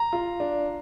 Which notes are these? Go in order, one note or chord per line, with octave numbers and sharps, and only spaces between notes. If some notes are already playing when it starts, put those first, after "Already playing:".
Already playing: A#5
F4
D4